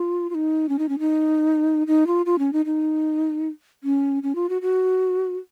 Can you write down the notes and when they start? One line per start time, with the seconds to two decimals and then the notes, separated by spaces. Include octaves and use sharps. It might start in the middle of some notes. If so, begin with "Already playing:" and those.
Already playing: F4
0.30 F4
0.35 D#4
0.69 C#4
0.79 D#4
0.89 C#4
0.99 D#4
1.87 D#4
2.07 F4
2.26 F4
2.39 C#4
2.53 D#4
2.66 D#4
3.83 C#4
4.23 C#4
4.35 F4
4.49 F#4
4.62 F#4